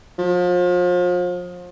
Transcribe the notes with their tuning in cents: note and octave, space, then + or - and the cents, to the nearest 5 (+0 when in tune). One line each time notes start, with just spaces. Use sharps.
F3 +35